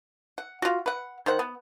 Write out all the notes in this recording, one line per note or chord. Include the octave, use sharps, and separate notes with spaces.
F#5
F4 F#4
B4 F#5
D#3 C5 F#5
B3